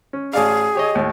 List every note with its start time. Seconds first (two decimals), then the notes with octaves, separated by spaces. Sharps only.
0.13 C#4
0.33 A1 G#4 D5 F5
0.75 G4 C#5 D#5
0.95 D#2 A2